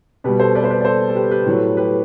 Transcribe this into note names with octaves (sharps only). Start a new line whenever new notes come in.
B2 G3 G4 B4
A4 C5
B4 D5
C5
B4 D5
D5
A4 C5
A4
G4 B4
G4 B4
A2 F#3 A3
G4 B4